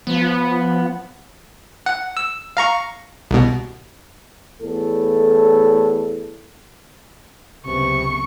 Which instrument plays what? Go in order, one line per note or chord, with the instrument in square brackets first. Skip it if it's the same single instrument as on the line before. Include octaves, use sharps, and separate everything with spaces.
[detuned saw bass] F3 [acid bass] B3
[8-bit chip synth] F#5
E6
F5 A#5 C#6
C2 B2
[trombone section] E2 A2 A4
[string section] C#2 F#2 B3 [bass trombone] C3 [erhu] C#6